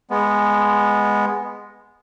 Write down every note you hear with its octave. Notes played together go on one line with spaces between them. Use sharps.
G#3 B3